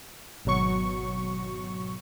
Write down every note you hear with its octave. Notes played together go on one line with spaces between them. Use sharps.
G#1 B2 F#3 C#6